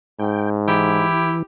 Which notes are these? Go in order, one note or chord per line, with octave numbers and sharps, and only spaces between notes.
G#2 G5
E3 E4 G4